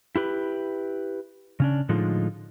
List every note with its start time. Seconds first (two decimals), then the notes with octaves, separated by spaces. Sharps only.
0.16 E4 G4 B4
1.60 C#3 C#4 D4
1.89 A2 D3 F3 G#3 D#4 F4